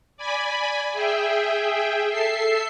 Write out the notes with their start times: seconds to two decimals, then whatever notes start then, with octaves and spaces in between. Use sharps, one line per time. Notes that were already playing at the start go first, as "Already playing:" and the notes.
0.17 D5 G#5 B5
0.92 G#4 E5 G5
2.10 A4 E5 C7